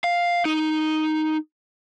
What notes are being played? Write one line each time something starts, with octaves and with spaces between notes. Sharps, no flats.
F5
D#4